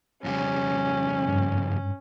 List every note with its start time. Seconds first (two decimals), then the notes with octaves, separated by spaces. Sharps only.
0.24 F2 C#3 G3 C#4
1.28 G2